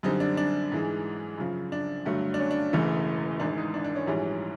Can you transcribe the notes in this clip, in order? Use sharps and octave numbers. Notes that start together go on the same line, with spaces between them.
F#2 D3 G3 C4 D#4
D4
D4
G#2 E3 G#3
F#2 C#3 F3
D4
G2 D3 F#3 A3
D4
C#4
D4
E1 E2 C#3 E3 A3
G#1 G#2 E3 D4
D#4
D4
D4
C#4
A#1 G#2 E3 G3 C#4